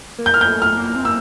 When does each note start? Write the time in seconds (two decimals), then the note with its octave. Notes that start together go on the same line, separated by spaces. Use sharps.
0.18 A#3
0.26 G6
0.34 F6
0.41 G6
0.47 A3
0.62 F6
0.77 A#3
0.96 C4
1.05 A#3 E6